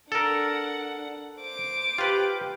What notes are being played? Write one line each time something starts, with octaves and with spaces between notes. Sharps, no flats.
D4 A4 A#4 F#5
C5 D6
F4 G4 B4